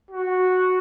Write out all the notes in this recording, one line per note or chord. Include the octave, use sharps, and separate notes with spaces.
F#4